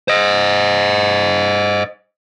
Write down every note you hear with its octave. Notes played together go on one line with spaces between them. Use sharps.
C5 D#5